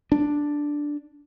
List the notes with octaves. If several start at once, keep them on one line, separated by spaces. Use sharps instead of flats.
D4